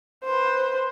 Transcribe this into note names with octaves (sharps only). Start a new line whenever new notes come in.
B4 C5